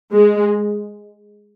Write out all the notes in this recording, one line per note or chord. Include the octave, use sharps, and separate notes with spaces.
G#3